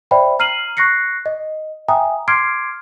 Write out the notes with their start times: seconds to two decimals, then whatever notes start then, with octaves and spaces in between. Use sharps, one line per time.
0.11 C5 D5 E5 G5 B5
0.39 A#5 F6 C7 D#7 F#7
0.77 C#6 F#6 A#6 C7 C#7
1.26 D#5
1.88 E5 G5 G#5 A#5 D#6
2.28 C6 D6 F6 G#6 C7 D7